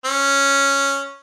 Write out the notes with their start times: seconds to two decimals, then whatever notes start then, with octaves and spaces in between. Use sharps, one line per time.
0.05 C#4